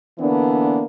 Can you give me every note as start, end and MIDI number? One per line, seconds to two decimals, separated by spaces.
0.19 0.83 50
0.19 0.83 52
0.19 0.83 58
0.19 0.83 59
0.19 0.83 62